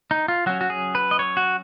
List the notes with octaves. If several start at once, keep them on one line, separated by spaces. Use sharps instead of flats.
D#4
F4
F#3 C#4 F#4
F#4
G#4
B4
D#5
C#5
F#4